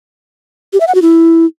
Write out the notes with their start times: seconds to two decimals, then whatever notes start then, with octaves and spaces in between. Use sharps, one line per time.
0.73 G4
0.80 E5
0.88 F#5
0.95 F#4
1.02 E4